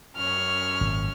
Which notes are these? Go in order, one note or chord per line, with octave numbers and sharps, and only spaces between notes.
F#2 C#4 C#5 F6
G#1 A#2